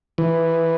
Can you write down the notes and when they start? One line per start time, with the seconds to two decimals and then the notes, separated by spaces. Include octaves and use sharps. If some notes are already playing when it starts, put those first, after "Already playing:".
0.18 E3